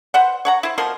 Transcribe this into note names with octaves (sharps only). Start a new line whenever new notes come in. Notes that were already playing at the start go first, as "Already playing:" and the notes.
B4 C5 F#5
C#5 F#5 A#5
E4 C5
B2 F3 A#4 C6